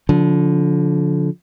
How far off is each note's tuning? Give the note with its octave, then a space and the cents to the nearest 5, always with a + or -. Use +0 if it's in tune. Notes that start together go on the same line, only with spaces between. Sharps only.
D3 -25 F3 +25